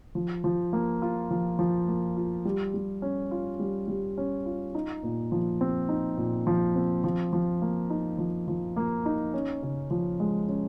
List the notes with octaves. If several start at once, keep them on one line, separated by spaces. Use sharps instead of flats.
F3
F3
A#3
F4
F3
F3
A#3
F4
G3
G3
C#4
F4
G3
G3
C#4
F4
D#4
A#2
F3
C4
D#4
A#2
F3
C4
F3
F3
A#3
D#4
F3
F3
A#3
D#4
C#4
C#3
F3
G#3
C#4